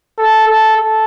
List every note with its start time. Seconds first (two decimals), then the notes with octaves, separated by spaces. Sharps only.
0.18 A4
0.47 A4
0.77 A4